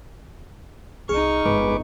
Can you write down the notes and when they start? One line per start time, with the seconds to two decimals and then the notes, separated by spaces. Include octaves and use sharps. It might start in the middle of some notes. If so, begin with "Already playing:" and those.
1.09 C2 D#3 D#4 G#4 C#6 F6
1.46 G1 F2 G#3 B4 D6